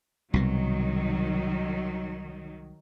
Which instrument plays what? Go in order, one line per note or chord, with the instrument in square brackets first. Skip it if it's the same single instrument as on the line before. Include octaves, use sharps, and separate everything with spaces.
[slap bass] C2 B2 [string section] D#3 F#3